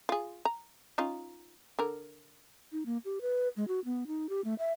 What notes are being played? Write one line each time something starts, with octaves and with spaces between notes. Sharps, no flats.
F4 G#4
A#5
C#4 D#4 F4
D3 A#4
D#4
A#3
G4
B4
G#3
F#4
B3
D#4
G4
A3
E5